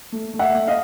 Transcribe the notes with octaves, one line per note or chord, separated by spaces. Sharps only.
A3
A3
E5 F#5
A3
D#5 F5